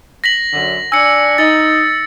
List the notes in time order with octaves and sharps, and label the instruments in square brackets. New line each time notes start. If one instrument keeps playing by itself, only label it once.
[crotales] A#6 B6 F#7
[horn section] F#2 D3
[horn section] D4 G#5 [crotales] E6 C#7
[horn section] D#4 [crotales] A6